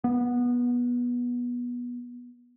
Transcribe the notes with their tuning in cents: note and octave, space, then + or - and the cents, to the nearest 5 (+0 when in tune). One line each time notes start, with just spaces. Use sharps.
B3 -20